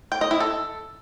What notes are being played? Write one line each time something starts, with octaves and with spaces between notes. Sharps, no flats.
G5
D#5
E4
A4